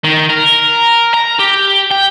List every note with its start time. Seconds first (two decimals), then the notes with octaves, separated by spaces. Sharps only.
0.04 D#3
0.30 A#4
1.14 A#5
1.39 G4
1.91 G5